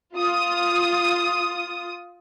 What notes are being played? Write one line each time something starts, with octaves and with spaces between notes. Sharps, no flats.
F4 D#6